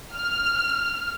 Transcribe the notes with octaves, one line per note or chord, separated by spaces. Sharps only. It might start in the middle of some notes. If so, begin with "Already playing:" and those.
F6